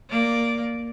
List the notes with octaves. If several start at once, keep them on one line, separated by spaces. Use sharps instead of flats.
A#3 D5